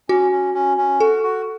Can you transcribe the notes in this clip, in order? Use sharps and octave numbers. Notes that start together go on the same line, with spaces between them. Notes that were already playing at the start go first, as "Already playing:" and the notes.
C#4 F#4
C#4
C#4
C#4
F#4 A4
F#4